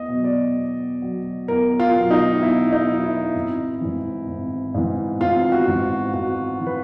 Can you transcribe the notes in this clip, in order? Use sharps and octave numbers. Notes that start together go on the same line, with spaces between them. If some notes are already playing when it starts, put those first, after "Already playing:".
Already playing: E2 D#5
B2 F#3
D5
E2
B2 F#3
E2 A#4
F4
B2 F#3
D#4
E2 E4
D#4
B2 F#3
E4
G#1
G#2 E3
G#1
G#2 E3
G#1 F4
F#4
G#2 E3
G#1 F#4
E3
B4